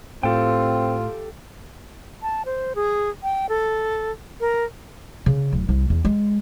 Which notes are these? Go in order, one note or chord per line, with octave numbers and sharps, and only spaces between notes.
A2 C4 F4 G4 A4 G5
A5
C5
G#4
G5
A4
A#4
C#3
D1
C2
E2
G#3